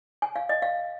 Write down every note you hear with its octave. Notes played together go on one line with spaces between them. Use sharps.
G#5
F5
D#5
F5